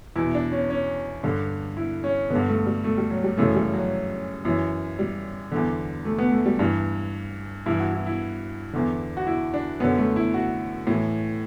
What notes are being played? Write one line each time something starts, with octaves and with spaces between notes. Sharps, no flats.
E2 B2 E4
D4
C#4
C#4
G2 D3
E4
C#4
G2 D3 B3
A3
G3
A3
G3
F#3
G3
F#2 C#3 E3 A3
G3
F#3
F#2 E3
G3
E2 D3
A3
B3
A3
G3
G2 E3 D4
G2 E3 E4
F#4
E4
E4
E2 D3
F#4
E4
D4
F#2 D3 B3
A3
E4
F#4
A2 E3